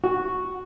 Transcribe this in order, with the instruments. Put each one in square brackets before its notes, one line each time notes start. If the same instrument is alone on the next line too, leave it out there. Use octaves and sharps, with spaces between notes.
[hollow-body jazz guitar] F#4